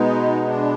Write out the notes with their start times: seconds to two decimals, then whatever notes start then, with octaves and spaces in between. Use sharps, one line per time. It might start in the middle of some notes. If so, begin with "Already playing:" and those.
Already playing: B2 G#3 B3 D#4
0.47 D4